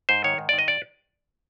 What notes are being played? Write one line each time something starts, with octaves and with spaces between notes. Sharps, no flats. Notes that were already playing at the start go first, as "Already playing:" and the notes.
G#2 C5
D#3 C#5
G#2
D5
D#3
D#5
D5